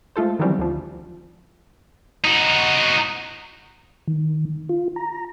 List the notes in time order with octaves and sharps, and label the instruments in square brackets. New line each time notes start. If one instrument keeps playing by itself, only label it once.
[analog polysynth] G#3 A3 F4 A4 C5
D#3 E3 F#3 G3 C4 C#4
D2 F3
[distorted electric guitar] D#4 F#4
[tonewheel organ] D#3
F4
A#5